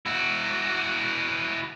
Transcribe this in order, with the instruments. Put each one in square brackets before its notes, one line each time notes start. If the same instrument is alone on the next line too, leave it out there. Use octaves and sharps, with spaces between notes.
[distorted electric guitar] E4 F#4